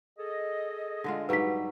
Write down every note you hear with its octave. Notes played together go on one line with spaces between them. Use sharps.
G#4 A4 D#5
D3 G#3 F4
G#2 F#3 G3 B4 B6